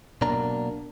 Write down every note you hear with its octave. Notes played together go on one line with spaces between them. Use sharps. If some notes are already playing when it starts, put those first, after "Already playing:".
B1 B2 A#3 D4 A#5